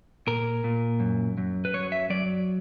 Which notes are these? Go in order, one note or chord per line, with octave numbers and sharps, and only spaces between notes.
A#2 A#4
A#2
F#2
F#2
B4
F#3 C#5
E5
F#3 D5